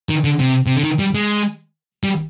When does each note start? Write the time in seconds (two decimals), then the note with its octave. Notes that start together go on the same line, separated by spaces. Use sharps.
0.09 D#3
0.24 D3
0.39 C3
0.66 C3
0.76 D3
0.84 D#3
0.99 G3
1.15 G#3
2.04 G3